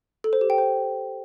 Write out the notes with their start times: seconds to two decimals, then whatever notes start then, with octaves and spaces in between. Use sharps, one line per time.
0.24 A4
0.33 C5
0.41 G4
0.50 G5
0.58 C5